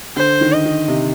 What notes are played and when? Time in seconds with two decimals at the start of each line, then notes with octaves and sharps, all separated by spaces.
0.16 D3 C5
0.41 D#3
0.52 D#5
0.65 D#3
0.88 C3